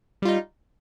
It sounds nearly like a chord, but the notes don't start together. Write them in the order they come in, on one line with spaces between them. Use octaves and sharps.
G3 F4 D#4